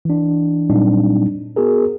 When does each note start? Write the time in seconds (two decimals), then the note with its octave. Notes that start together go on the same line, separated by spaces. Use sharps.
0.05 E3 D4
0.70 A#2 F#3 G3 C4 D4 D#4
1.56 B3 F#4 G#4 A#4